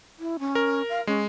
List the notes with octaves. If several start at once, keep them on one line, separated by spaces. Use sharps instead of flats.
E4
C#4
A#4
F5
G#3 C#4